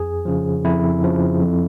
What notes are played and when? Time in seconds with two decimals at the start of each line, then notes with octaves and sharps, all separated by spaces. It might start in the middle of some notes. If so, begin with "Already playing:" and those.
Already playing: F2 G#4
0.25 C#3 F3
0.64 F2 E4
1.03 C#3 F3
1.42 F2